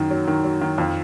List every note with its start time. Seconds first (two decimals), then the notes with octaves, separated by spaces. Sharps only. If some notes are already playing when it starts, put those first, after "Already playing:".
Already playing: F#2 D#3
0.11 F#3
0.27 D#3
0.44 F#3
0.61 D#3
0.78 F2